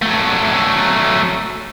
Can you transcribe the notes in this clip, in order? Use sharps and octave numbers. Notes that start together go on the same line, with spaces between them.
F#3 A3